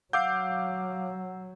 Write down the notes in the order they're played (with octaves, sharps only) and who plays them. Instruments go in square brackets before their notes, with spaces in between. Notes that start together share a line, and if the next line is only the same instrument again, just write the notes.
[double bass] F#3 [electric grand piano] F5 D6 G6 [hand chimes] F#5 E6 C7